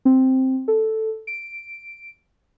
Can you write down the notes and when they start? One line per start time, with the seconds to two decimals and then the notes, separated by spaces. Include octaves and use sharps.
0.05 C4
0.68 A4
1.27 D7